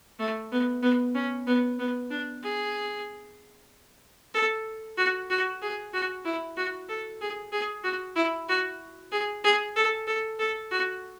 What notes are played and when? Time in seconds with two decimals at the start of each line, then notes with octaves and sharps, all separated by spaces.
0.19 A3
0.52 B3
0.83 B3
1.15 C#4
1.47 B3
1.79 B3
2.11 D4
2.43 G#4
4.34 A4
4.98 F#4
5.30 F#4
5.62 G#4
5.94 F#4
6.25 E4
6.57 F#4
6.89 A4
7.21 G#4
7.53 G#4
7.84 F#4
8.16 E4
8.49 F#4
9.12 G#4
9.44 G#4
9.76 A4
10.07 A4
10.39 A4
10.71 F#4